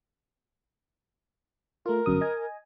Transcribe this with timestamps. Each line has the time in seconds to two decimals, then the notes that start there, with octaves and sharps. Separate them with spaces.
1.86 A3 F4 A#4
2.06 G1 F#2 D#6
2.21 D#5 G#5